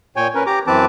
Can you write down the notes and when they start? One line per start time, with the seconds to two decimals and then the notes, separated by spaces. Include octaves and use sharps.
0.16 A#2 C#5 G5 G#5
0.35 C#4 A#4 B4
0.46 G4 A#5 D6
0.67 F#2 E3 C4 B4 A5 D6